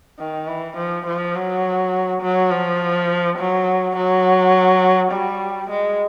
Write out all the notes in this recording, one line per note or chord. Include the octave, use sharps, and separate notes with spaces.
D#3
E3
F3
F3
F#3
F#3
F3
F#3
F#3
G3
G#3